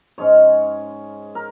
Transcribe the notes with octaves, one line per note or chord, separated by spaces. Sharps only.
G#2 G#3 C#4 C#5
A#4